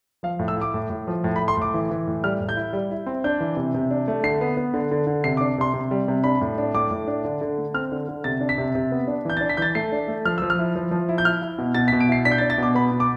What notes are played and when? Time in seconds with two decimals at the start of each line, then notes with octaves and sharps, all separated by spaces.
0.23 F3 F5
0.39 A2
0.48 E6
0.57 E4 D6
0.74 A2
0.90 A2
1.07 F3
1.24 A2
1.36 B5
1.40 A2
1.48 C6
1.57 A2 D6
1.74 E3
1.91 E3
2.08 A2
2.24 G3 F6
2.40 A2
2.49 G6
2.57 E4
2.73 G3
2.91 E4
3.06 C4
3.24 D4 G6
3.40 E3
3.57 C3
3.74 C3
3.91 D4
4.08 A3
4.24 D3 C7
4.41 B3
4.57 B3
4.74 D3
4.91 D3
5.07 D3
5.24 C3 C7
5.37 D6
5.41 D4
5.58 C3 C6
5.74 C3
5.91 G3
6.08 C3
6.24 D4 B5
6.41 A2
6.58 D4
6.74 A2 D6
6.91 A2
7.08 D4
7.25 D3
7.41 D3
7.58 A3
7.74 C4 F6
7.92 D3
8.08 D3
8.24 C3 A6
8.41 D4
8.49 B6
8.58 C3
8.75 C3
8.92 B3
9.07 D4
9.25 E3 G6
9.37 A6
9.41 D4
9.49 B6
9.57 E3 G6 A6
9.75 A3 C7
9.92 D4
10.08 A3
10.25 F3 F6
10.38 F3 E6
10.50 F6
10.59 E4
10.76 F3
10.91 F3
11.09 E4
11.18 G6
11.25 E4 F6
11.42 E4
11.58 B2
11.75 B2 A6
11.88 B6
11.92 B2
12.00 D7
12.09 E4 C7
12.25 D4 B6
12.32 G6
12.38 A6
12.41 D4
12.50 A6
12.58 B2 D6
12.75 B3 B5
12.91 B2
13.00 D6